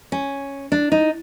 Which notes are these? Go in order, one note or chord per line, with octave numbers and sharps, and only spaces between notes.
C#4
D4
D#4